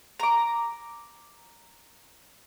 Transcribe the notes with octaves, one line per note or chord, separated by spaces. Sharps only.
A#5 D6